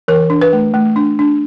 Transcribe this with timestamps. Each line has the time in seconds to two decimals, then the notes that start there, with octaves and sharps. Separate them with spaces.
0.08 E3 A#4
0.30 D4
0.42 B4
0.53 A3
0.74 A3
0.96 D4
1.19 D4